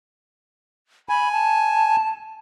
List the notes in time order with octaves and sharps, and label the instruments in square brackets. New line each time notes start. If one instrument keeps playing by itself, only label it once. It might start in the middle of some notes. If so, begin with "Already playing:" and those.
[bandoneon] G#5 [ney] B5
[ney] A5